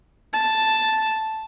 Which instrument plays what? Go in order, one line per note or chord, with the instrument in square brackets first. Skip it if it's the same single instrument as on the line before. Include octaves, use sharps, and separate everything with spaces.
[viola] A5